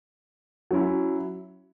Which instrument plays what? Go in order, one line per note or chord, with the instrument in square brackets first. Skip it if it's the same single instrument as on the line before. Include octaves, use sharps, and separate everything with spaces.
[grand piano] F#3 C#4 E4